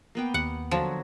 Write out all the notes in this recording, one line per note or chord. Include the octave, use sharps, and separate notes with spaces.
A#3 B3 G5
D#2 F#5
D3 F3 F#3